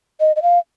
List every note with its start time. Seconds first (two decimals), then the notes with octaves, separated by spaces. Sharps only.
0.20 D#5
0.36 D#5
0.42 F5